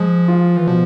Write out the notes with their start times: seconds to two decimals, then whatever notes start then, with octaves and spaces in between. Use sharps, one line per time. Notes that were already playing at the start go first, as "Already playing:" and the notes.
Already playing: F3 G#3
0.28 F4
0.57 E3
0.67 B2 F3